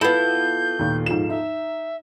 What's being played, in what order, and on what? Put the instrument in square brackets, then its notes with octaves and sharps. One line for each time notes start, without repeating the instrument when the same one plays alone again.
[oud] B3 E4 [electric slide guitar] F4 A4 [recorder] G6
[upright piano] D#2 A#2
G#2 F3 E7
[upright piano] D#4 [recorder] E5